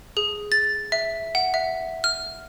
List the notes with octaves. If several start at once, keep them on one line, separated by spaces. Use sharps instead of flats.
G#4
A6
E5
F#5
E5
F6